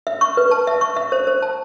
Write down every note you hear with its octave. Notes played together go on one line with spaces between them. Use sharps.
E5
C#6
B4
A5
E5
C#6
E5
C5
C5
A5